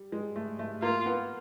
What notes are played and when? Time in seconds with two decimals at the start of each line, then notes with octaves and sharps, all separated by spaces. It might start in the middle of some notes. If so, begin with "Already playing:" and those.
Already playing: G3
0.12 G#3
0.36 A3
0.59 A3
0.82 A#3 F4
1.06 B3